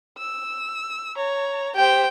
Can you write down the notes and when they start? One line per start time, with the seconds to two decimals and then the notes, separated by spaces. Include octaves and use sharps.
0.18 E6
1.17 C#5 A#5
1.76 G4 C5 G5